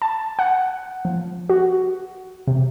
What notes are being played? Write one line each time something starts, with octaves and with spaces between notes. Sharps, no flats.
A5
F#5
F3
F#4
C3